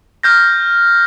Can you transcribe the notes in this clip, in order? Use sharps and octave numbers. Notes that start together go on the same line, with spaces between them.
F6 G6 A#6